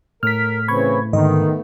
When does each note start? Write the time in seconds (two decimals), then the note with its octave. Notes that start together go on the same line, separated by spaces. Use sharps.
0.23 A2 A#4 F6 B6
0.68 C#3 E3 C4 B5 C#6 G#6
1.13 G#2 D3 D#3 A3 B3 D#5